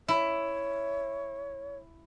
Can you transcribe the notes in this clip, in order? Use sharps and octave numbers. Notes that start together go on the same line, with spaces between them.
E4 C#5